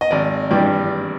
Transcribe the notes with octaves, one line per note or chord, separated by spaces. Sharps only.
D#5
G#1 D5
G2 E3 G3 D5